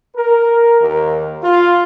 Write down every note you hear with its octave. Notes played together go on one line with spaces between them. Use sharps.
A#4
D#2
F4